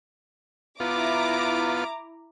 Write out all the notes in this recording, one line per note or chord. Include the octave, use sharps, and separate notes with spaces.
B3 E4 F4 A#5 D6